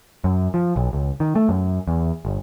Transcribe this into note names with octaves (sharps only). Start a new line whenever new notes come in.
F#2
F3
B1
C#2
D#3
A3
F#2
E2
G1